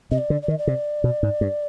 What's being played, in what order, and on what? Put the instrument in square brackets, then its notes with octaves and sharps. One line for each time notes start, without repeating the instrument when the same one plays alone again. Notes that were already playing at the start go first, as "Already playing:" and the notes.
[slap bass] C3 [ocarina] D#5
[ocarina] D5
[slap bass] D3
[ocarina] D5
[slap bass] D#3
[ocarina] D#5
D5
[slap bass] C3
B2
G#2
G2